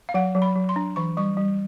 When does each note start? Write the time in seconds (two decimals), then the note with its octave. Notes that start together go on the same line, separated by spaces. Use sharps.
0.09 F5
0.14 F#3 F#5
0.35 F#3
0.42 B5
0.56 F#3
0.69 C6
0.76 D4
0.96 E3 C#6
1.17 G3 C#6
1.37 G3